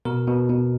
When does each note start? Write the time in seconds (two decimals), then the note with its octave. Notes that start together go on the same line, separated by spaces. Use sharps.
0.05 B2 A#4
0.27 B2
0.49 B2